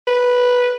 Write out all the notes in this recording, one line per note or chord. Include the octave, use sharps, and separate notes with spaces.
B4